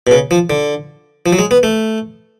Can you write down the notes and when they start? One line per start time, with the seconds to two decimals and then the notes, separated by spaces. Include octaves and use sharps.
0.07 B2
0.11 C#3
0.31 F3
0.50 D3
1.26 F3
1.33 F#3
1.39 G#3
1.51 B3
1.63 A3